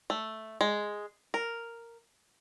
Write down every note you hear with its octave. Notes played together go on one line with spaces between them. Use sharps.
A3
G#3
A#4